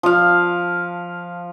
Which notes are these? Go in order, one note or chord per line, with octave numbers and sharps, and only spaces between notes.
F3 F5